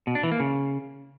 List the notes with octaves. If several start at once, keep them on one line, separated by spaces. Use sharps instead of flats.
B2
D4
E3
A#3
C#3